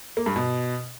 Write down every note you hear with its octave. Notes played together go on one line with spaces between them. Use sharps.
A#3
G2
B2